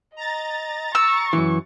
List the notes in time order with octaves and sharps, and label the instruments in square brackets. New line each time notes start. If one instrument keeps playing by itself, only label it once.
[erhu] D#5 [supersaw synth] A#5 A6
[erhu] C#6 [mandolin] E6
[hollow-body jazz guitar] F#2 E3